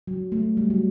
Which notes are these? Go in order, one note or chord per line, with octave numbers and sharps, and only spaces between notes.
F#3
A3
G3
F#3